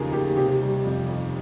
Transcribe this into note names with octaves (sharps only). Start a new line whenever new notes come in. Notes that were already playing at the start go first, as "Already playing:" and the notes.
Already playing: D#2 C#3 F3 G#4 A#4
D#2 G4
C3 G4
G3
F2
F2